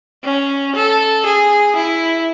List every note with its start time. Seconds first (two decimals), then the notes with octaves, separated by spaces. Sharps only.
0.24 C#4
0.75 A4
1.25 G#4
1.76 E4